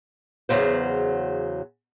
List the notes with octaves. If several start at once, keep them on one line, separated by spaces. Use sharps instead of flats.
E2 C#3 F#3 C5